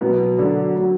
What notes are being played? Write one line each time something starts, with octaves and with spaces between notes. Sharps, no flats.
B2 F#3 B3
D3 F#3 D4
F#3